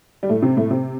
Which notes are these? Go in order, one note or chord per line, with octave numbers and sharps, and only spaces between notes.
G3
A2 A3
C3 C4
A2 A3
C3 C4